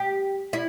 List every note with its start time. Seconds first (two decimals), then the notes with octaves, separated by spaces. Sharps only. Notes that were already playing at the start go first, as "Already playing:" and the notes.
Already playing: G4
0.53 E4